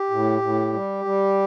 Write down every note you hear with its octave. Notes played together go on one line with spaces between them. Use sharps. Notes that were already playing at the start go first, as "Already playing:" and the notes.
Already playing: G4
A2
A2
G3
G3